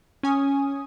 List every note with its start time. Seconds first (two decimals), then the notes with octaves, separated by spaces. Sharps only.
0.23 C#4 G#5 D#6